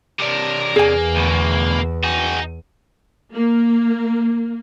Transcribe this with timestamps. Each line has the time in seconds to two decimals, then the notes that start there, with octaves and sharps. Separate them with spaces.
0.20 C3 D4 A#4
0.76 E2 A#3 G#4 G#5
1.16 D2 B2
2.04 D#4 F#4 G#4
3.35 A#3